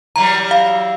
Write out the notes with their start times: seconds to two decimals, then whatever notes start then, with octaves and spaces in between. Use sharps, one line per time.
0.16 E3 F#3 G3 A#5
0.51 F5